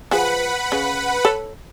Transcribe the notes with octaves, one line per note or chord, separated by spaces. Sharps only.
F3 G#4 B4 F#5 B5
C#3
A4 C#5